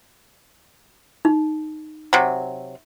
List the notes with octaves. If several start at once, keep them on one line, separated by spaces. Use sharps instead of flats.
D#4
C3 F#3